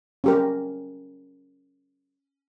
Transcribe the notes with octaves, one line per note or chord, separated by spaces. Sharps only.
C#4 G4 A#4